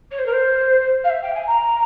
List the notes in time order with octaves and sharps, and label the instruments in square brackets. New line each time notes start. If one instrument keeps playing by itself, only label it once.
[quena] C#5
C5
A#4
C5
F5
E5
G5
G#5
A#5